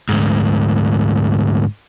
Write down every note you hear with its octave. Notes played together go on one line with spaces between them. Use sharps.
D2 G#2